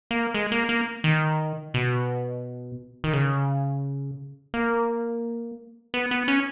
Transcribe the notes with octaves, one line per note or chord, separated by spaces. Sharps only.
A#3
G#3
A#3
A#3
D#3
B2
D#3
C#3
A#3
B3
B3
C#4